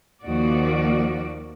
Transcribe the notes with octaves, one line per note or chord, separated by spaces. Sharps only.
D#2 D#3 F3 A#3 F#4 D5